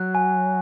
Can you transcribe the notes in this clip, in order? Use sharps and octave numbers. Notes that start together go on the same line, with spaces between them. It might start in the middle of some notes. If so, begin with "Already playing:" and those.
Already playing: F#3 F#6
G#5